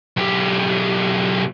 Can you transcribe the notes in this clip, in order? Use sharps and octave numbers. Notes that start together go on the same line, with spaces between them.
B1 G4